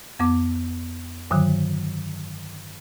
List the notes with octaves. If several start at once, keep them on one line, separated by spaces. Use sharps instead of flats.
F2 B3 D6
G2 D3 D#3 F#3